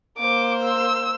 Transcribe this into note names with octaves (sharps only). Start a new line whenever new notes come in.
A#3 C5 D6
E6